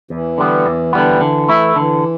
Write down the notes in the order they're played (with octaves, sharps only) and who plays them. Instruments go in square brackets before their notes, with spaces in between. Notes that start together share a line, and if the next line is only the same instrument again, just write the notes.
[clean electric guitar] E2 [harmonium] E3
[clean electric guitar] D3 G3 B3
E2
D3 G3 B3
D3
A3 E4
[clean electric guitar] D3 [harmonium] E3